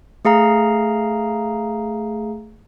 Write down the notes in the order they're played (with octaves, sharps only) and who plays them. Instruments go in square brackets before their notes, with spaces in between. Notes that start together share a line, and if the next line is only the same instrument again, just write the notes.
[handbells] A3 G#4 F5 A#5